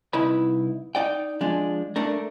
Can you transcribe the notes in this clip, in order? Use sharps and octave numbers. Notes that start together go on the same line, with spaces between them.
C2 D#4 E4 B4 B5
D#4 D5 G5
F3 G#3 D4
A3 D4 A#4